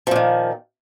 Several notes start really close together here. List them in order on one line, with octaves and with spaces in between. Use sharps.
F3 A#2 D#3